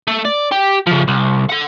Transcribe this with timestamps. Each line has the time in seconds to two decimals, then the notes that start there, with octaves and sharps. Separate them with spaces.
0.08 A3
0.25 D5
0.52 G4
0.87 C#3 F3
1.08 C2
1.50 A4 F#5